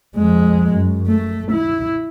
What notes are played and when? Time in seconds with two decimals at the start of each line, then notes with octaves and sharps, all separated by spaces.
0.17 F2 G#3
0.74 F#2
1.07 A3
1.52 E4